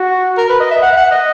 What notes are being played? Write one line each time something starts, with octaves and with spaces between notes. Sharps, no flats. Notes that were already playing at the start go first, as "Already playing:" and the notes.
Already playing: F#4
A#4
B4
D#5
E5
F#5
E5
F#5
D#5